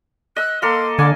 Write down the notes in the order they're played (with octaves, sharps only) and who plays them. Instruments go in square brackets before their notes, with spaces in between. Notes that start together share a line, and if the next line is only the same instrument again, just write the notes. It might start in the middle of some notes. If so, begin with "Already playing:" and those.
[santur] D#5 E6 [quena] F#6
[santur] A#3 A4 F5 [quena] C6
[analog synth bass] D3 [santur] G#5 [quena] D6